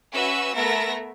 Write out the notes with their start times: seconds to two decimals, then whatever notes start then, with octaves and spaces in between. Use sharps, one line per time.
0.12 C#4 F#4 B4 E5 E6
0.55 A3 B3 A#4 E5 A#6